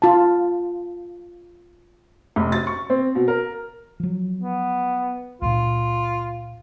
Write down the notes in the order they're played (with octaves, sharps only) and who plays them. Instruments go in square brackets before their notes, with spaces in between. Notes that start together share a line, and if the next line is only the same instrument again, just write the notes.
[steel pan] F4 A5
[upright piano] F1
A6
C#6
C4
B2
A#4
[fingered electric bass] F3 F#3
[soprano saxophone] B3
[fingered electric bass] C#2 A#2 [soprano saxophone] F4